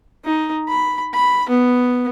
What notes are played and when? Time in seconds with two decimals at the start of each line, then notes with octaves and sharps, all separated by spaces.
0.25 D#4
0.69 B5
1.13 B5
1.49 B3